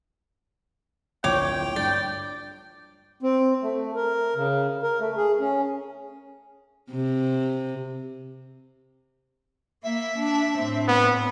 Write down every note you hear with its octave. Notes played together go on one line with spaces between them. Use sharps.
D1 A#1 C#5 G5 D6
G2 D5
C4
A3
A#4
C#3
A#4
A3
G#4
C#4
C3
A#3 E5
D4
A2 C4
B3